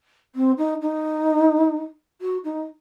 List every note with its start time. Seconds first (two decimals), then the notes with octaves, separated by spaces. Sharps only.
0.35 C4
0.58 D#4
0.82 D#4
2.21 F#4
2.44 D#4